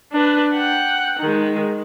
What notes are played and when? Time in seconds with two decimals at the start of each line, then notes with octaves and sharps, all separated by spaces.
0.12 D4 B4
0.54 F#5 G5
1.20 D#3 G#3